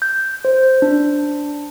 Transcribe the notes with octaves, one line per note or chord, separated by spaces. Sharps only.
G6
C5
D4